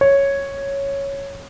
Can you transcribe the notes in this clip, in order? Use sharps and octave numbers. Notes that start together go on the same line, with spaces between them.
C#5